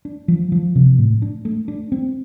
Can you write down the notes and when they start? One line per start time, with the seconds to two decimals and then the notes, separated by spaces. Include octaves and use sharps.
0.05 D4
0.28 F3
0.52 F3
0.75 C3
0.98 A2
1.22 D4
1.45 A3
1.68 D4
1.92 C4